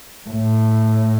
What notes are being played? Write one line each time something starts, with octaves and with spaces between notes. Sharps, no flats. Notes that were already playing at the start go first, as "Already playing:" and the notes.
A2